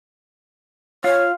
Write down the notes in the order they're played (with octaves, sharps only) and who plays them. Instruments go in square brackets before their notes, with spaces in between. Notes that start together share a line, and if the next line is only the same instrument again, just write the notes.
[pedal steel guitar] F4 F5 [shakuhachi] C#5